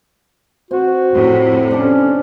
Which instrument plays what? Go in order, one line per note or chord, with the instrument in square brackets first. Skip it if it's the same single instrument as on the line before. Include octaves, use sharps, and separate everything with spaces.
[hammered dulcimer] C4 [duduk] F#4
[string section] F2 A2 C3
[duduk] C#4 [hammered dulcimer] D4 A4